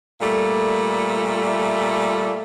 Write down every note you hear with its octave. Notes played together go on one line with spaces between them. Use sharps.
A#2 G3 A3